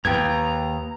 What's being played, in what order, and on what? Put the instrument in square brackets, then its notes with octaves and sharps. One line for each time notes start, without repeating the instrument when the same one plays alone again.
[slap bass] D#2 [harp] B4 G5 [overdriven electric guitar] A#5 [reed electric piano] G#6